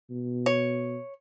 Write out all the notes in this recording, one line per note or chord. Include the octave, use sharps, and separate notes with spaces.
B2
C#5